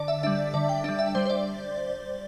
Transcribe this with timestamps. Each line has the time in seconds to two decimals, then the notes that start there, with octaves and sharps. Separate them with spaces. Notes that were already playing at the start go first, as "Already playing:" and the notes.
Already playing: D3 D5
0.08 E5
0.23 G3 D4 E5
0.54 D3 D5
0.69 G5
0.84 G3 D4 E5
0.99 E5
1.15 G3 C5
1.25 C5
1.30 D5